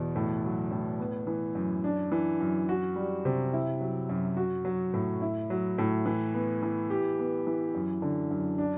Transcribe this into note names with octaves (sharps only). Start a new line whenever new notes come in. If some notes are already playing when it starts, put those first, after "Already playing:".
Already playing: E2 B2
A2
F#3
A2
B3
E3
F#2
D4
E3
F#2
F#4
G3
C3
E4
F#3
F#2
F#4
F#3
A2
E4
F#3
A2
E3
B3
E3
G4
B3
E3
F#2
D3
F#2
D4